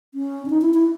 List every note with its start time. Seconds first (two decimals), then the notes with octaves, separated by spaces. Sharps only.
0.14 C#4
0.46 D4
0.50 D#4
0.61 E4
0.74 E4